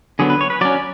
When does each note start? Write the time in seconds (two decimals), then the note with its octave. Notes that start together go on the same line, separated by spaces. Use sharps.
0.19 D3 F#3 B3 G#4
0.30 B4
0.41 C#5
0.50 B4
0.61 F#3 C#4 D5